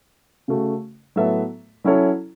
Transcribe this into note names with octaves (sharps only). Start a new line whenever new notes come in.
C#3 A3 F#4
A2 F#3 B3 A4 E5
F#3 C#4 E4 A4 C#5